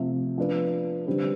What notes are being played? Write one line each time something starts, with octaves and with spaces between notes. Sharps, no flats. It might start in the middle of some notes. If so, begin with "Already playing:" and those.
Already playing: C3 F3 A3
F3 B3 D4 F4 B4
D3 G3 C4 G4 B4